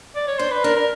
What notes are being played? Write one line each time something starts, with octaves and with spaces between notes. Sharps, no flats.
D5
C#5
D4 C5
B4
D4 A#4
A#4